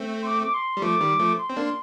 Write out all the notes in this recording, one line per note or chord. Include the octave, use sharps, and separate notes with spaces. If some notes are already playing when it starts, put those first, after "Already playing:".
Already playing: A3 C4
C6
D6
D6
C6
G3
F3 A3 D6
D#3 G3
F3 A3
C6
C4
A#3 D4
C6